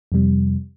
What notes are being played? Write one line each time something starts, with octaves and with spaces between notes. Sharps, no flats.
F2 C3 G3